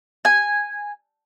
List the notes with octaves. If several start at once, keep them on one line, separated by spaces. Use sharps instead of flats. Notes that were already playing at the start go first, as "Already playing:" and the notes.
G#5